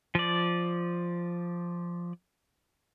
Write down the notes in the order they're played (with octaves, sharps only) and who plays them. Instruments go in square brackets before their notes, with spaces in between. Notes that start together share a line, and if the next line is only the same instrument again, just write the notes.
[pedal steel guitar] F3 D5